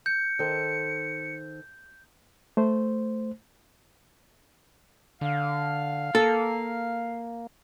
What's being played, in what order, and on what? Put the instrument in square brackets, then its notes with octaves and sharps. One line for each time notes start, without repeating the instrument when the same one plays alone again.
[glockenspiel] G6 [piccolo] C#7
[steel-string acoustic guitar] D#3 A4 C5
[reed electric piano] A3 C5
[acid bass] D3 [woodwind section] F5
[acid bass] A#3 [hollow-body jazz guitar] A4